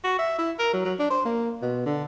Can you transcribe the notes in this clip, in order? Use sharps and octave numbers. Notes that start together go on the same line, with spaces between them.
F#4
E5
E4
A#4
F#3
F#3
D4
C5
A#3
B2
D3